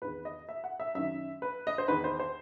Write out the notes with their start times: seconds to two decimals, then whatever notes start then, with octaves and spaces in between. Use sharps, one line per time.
0.02 E2 D#3 B4
0.25 D#5
0.49 E5
0.64 F#5
0.80 E5
0.95 F#2 D#3 E5
1.42 B4
1.67 D#5
1.78 C5
1.88 E2 D#3 B4
2.04 C5
2.20 C5